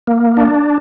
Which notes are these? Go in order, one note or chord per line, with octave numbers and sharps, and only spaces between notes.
A#3
D4